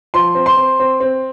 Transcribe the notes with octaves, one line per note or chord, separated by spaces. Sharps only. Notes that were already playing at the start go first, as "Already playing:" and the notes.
F3 C6
C4
C6
C4
C4
C4